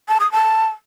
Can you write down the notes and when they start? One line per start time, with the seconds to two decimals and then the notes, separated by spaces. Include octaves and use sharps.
0.08 A5
0.20 D#6
0.32 A5